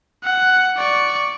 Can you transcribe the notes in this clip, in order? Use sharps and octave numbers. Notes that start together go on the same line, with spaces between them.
F#5
D5 C#6